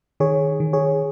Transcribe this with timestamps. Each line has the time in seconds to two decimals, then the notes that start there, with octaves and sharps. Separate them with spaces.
0.20 D#3 G#4 C#5
0.60 D#3
0.73 G#4 C#5